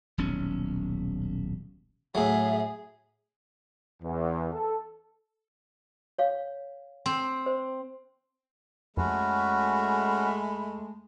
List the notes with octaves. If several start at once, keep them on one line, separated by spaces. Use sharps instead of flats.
D#1 B1 C#4
A2 F#3 G#4 E5
E2
A4
C#5 F5
C4
C5
F2 G#3 A3 C#4 F#4 B5